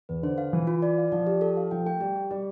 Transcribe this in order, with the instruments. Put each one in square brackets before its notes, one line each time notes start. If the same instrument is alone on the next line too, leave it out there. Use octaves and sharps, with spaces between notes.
[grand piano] E2 [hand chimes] B4
[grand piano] D3 [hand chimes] C5
[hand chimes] F5
[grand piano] E3 [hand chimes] F4
[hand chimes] F4
D5
F5
[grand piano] F3 [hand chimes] D5
[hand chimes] G4
A4
F5
[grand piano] F3 [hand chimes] G5
[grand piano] A3 [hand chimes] G5
[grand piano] G3 [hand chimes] G4
[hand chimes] G4
[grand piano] G3 [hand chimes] G4